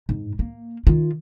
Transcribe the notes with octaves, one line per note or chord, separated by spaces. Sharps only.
G#2
A#3
D#3 F4